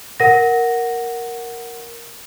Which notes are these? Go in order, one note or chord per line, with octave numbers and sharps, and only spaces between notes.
A#4 F#5 A#6